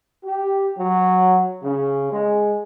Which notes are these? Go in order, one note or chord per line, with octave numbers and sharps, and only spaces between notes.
G4
F#3
C#3
G#3